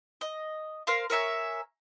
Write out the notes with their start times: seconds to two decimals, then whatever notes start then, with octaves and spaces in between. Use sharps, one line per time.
0.21 D#5
0.87 A#4 C5 F5 C6
1.10 A#4 C#5 E5 G#5